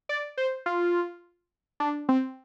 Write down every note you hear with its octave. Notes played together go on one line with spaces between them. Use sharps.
D5
C5
F4
D4
C4